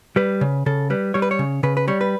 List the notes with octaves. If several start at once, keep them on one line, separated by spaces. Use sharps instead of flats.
G3 B4
C#3
C#3 A4
G3 B4
G3 C#5
B4
C#5
C#3
C#3 B4
B4
G3 C#5
B4